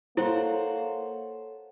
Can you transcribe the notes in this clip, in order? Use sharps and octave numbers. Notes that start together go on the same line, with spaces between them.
A#3 E4 A4 C5 C#5 F#5